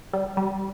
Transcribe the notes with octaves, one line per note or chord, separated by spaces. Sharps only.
G3
G3